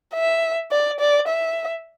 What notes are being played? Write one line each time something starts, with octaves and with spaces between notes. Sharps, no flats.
E5
D5
D5
E5